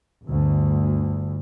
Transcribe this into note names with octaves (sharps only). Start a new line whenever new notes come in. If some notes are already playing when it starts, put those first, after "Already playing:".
G1 D2